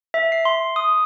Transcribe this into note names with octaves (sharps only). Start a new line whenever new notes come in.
E5
C7
C6
D#6